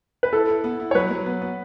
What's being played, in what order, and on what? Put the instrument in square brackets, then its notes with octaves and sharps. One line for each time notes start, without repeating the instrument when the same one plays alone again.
[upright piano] B4
[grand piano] E4 [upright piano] A4
[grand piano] E4
B3
E4
[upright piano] C#5
[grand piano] F#3 [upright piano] B4
[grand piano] F#3
B3
B3